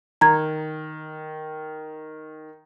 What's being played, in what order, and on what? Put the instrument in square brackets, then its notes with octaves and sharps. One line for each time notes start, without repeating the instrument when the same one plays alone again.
[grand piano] D#3 [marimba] A#5 G#6